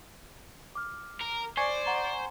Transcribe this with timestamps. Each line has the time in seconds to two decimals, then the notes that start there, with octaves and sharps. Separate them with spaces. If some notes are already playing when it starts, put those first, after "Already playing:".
0.75 D6 F6
1.21 A#4
1.57 C5 D5 G#5 C#6
1.86 F#5 A#5